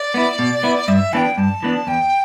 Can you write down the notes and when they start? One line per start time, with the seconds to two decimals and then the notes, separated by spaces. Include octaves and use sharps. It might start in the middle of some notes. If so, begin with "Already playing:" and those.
Already playing: D5
0.14 B3 E4
0.39 B2
0.63 B3 E4
0.88 G2 E5
1.13 E3 B3 D4 G5 A5
1.38 G2 A5
1.63 E3 B3 D4
1.87 E2 G5